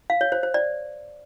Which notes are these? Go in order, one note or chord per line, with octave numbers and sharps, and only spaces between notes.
F5
C#5
C5
C5
D5